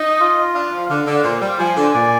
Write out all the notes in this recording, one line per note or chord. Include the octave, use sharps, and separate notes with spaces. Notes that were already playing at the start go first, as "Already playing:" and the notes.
Already playing: D#4 D#5
F4
D4 F5
F3
D3 F5
D3
A#2 C5
G3
F3 G#5
D3
A#2 D5